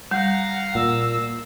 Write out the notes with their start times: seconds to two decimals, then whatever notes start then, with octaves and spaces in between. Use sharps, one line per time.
0.11 G3 F5 F#5 A#5 G6
0.75 A#2 E6